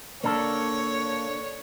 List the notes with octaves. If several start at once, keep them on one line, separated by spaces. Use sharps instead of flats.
D3 A#3 D4 A4 C#5